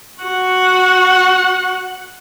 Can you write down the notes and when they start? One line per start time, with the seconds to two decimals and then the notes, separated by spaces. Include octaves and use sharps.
0.23 F#4 F#5